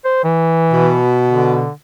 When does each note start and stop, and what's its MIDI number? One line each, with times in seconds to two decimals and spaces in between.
0.05 0.19 72
0.24 0.99 52
0.72 1.65 47
1.27 1.71 50